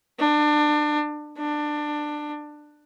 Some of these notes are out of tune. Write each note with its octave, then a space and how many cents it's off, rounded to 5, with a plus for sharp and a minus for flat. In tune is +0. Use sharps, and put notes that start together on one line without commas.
D4 +25
D4 +20